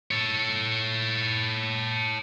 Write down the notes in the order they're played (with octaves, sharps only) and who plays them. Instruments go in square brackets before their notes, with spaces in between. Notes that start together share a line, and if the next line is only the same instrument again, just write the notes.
[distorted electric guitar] A4 C#5